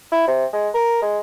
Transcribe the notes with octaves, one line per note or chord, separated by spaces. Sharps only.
E4
C3
G#3
A#4
G#3